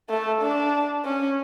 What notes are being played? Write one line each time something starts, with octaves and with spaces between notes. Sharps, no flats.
A3
D4
C#4